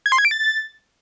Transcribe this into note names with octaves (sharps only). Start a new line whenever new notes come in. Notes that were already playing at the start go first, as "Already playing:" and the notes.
G#6
C6
G#6
D7
A6